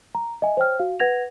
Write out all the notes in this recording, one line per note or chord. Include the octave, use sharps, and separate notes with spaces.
A#5
D#5 E5 G#5
C5 C#5 G5 F6
F#4 F5
B4 F#5 G#6 A#6 F7